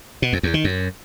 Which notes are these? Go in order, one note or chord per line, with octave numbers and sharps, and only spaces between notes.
B2
F2
E2
D#3
F#2